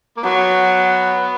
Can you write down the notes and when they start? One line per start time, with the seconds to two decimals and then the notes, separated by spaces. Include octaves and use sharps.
0.17 A#3
0.23 F#3 B3